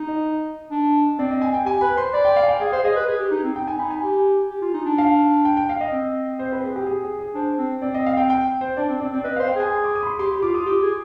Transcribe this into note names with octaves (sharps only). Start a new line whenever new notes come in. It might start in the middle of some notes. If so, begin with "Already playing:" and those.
Already playing: D#4
D#5
D4
C4 D5
D#5
G#5
G5
G4 G#5
B4 B5
C5 C6
D5 B5
G5
F5
G#5
G5
G#4 F5
C5 F5
G#4 D#5
B4
G#4
G4
D#4
C4
D#4 G5
G#5
D#4 B5
G#5
G4
G4
F4
D#4
D4
F5
G5
G5
F5
D#5
C4
C5
B4
G#4
G4
G#4
G#4
G#4
D4 C5
C4
C4 D5
D#5
F5
G5
G5
C5
D4 D5
C4
C4 D5
C4 D5
B4 D#5
C5 F5
G5
G#4 G#5
C6
D6
D#6
B5
C6
G4 C6
G4 B5
F4 D6
F4 D#6
G4 D6
G#4